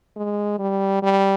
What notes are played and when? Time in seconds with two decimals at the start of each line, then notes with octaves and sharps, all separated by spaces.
0.16 G#3
0.59 G3
1.02 G3